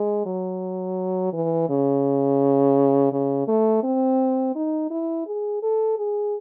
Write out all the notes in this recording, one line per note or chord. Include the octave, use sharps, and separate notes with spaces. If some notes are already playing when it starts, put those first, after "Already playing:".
Already playing: G#3
F#3
E3
C#3
C#3
A3
C4
D#4
E4
G#4
A4
G#4